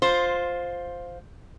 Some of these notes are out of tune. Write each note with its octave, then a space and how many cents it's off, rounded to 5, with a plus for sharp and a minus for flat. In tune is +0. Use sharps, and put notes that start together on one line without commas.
F4 +10 C5 +0